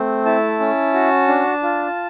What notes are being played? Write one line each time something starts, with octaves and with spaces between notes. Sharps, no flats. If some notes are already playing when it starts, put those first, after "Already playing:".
Already playing: A3 C4
E4 A5
C#4
F#4
D4
F4